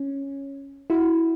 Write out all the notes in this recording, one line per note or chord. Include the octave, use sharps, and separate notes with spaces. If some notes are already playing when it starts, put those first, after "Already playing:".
Already playing: C#4
E4 F#4